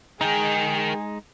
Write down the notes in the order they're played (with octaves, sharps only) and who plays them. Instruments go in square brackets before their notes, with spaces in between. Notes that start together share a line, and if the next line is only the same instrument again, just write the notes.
[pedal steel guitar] G#3 D#4 [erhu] G#4 [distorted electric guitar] A#4 G5